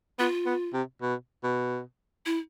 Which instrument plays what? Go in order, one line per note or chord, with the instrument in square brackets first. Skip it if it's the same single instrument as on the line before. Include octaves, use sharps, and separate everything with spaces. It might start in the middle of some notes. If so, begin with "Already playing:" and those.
[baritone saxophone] B3 [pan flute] F4
[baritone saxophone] B3
C3
B2
B2
[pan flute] E4